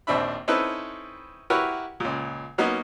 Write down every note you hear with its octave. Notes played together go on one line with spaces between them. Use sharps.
A#1 D#2 C4 D4 E5 B5
C4 C#4 D#4 E4 A4 B4
E4 F#4 G4 A#4 B4 C#5
C#2 A#2
F#3 A#3 B3 C#4 D#4